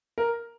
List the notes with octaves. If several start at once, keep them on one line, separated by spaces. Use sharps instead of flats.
A#4